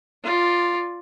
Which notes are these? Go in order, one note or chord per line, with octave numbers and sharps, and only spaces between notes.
F4 D5